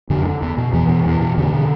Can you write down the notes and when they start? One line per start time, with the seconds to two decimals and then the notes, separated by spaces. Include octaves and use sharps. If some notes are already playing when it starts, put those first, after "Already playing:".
0.10 F2 D3
0.26 D3
0.42 E2
0.58 B2
0.73 E2 E3
0.89 B2
1.06 E2
1.21 B2
1.37 E2 D3
1.53 B2